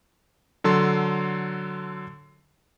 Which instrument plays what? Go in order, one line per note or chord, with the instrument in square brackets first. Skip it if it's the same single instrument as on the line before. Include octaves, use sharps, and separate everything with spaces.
[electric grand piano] D3 F#3 A4 C6